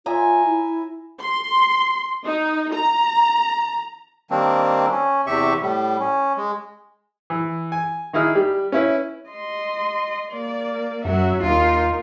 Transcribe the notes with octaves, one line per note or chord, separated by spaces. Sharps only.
F4 E5 G#5 A#5
E4
C6
D#4
A#5
D#3 G3 A#3 C4 D4
C#4
E2 C3 G4 E5 C#6
A2 G3
C#4
G#3
E3
G#5
D#3 D#4 E4 G#4 F6
G3
C#4 E4 B4
D#5 C6
A#3 D5
F#2 F#3 F#4 E5
D#2 D#4 F4 A#4